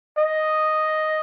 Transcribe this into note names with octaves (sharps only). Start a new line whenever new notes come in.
D#5